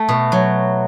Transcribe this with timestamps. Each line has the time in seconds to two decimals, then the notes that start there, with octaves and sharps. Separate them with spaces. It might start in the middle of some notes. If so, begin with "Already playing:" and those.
Already playing: A3
0.09 B2
0.32 F#3